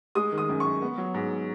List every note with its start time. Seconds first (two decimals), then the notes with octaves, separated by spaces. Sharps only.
0.15 G#3 D#6
0.32 D#3
0.38 D#6
0.49 F#2
0.60 F#2 C#6
0.82 B3
0.98 F#3
1.14 G#2